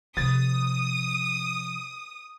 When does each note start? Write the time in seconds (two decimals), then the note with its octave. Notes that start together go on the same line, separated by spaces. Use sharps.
0.17 C3 F3 D#6 A6